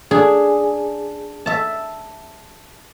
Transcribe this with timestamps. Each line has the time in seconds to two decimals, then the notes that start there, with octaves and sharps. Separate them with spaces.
0.11 D4 G#4
1.46 E5 A5